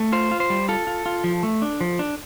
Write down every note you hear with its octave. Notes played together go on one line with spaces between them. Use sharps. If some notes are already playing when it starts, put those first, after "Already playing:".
Already playing: A3
F4 C5
F4
C5
G3
F4 A4
F4
F4
F3
A3
D4
F3
D4